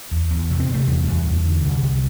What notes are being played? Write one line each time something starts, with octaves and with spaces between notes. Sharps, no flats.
E2
E2
C3
C4
C3
A3
E2 G3
E2
E2
D3
C2
C2